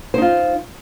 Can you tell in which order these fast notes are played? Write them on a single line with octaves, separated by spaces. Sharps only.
C5 D#4 F4